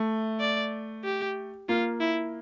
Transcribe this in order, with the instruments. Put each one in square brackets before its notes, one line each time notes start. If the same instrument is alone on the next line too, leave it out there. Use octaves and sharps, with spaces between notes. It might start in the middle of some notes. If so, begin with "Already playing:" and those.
Already playing: [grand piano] A3
[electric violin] D5
G4
[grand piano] A#3 [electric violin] F4
[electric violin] E4